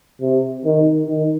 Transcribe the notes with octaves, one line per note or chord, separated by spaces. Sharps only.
C3
D#3
D#3